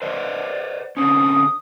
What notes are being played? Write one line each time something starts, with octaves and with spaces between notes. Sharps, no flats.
B4 C5 D5 D#5 F#5
D3 C4 C#4 D#6